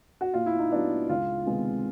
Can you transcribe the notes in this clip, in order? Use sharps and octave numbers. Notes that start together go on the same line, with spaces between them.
F#4
A#2 F4
E4
D#4
F#3 B3 D4
C#2 F4
C3 D#3 G#3 B3